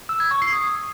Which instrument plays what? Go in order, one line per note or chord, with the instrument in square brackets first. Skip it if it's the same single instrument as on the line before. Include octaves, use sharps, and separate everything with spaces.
[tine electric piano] E6
G#6
C#6
C7
D#6